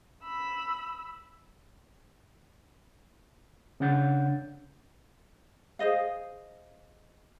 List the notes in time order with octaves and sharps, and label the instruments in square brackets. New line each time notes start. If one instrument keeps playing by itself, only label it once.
[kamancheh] B5 E6
[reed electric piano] C#3 C#4 D4 F#5 G6 A6
[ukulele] G#4 C5 D#5 F5